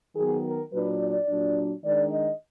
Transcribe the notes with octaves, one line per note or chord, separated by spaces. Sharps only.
D#3 F#3 B3 G#4
A#4
A#2 F#3 D4 B4
D5
A#2 F#3 D4
D#3 G#3 D4 D5
D#5